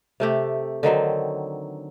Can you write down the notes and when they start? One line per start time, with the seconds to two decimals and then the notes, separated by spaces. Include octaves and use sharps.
0.20 C3 A3 G4
0.83 D3 D#3 F#3 C4